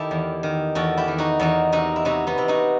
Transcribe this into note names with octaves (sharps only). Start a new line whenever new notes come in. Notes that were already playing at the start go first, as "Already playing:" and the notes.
Already playing: D#3 E4 G4 A4
E2
D#3
E2 F#4 A4
E4 G4
D#3
D#4 F#4
E2 D#4 F#4
C3 D#4 F#4
E4
C3 D#4 F#4
B3 D#4
C3
D#4 F#4